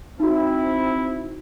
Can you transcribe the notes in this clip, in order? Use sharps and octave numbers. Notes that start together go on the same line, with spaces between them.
C4 D#4 E4 F#4